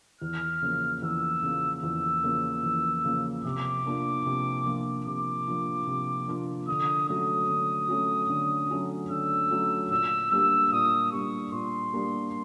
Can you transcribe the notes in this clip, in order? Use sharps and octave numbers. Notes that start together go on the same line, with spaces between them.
E2 F6
C#3 F3 A#3
E2 E6
C#3 F3 A#3
E2 E6
C#3 F3 A#3
E2
C#3 F3 A#3
C3 D6
F3 A#3 D4 F4
C3
F3 A#3 D4 F4
C3 D6
F3 A#3 D4 F4
C3
F3 A#3 D4 F4
D3 D#6
F#3 A3 C#4 F#4 D#6
D3
F#3 A3 C#4 F#4
D3
F#3 A3 C#4 F#4
D3 E6
F#3 A3 C#4 F#4
A#2 E6
G3 A#3 D4 G4 E6
A#2 D#6
G3 A#3 D4 G4 C#6
A#2 C6
G3 A#3 D4 G4